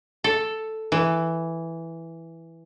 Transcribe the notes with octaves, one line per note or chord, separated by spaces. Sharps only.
A4
E3